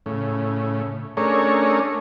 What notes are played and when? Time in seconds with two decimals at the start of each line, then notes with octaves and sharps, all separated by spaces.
0.06 A2 C#3
1.17 A3 C#4 D4 G#4 A#4 C#5